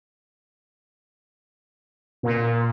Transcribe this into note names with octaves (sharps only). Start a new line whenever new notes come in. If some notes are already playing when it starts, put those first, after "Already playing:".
A#2